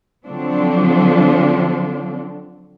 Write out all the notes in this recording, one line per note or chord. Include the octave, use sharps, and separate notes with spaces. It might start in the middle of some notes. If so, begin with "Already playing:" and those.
D3 F3 F#3 C4 D4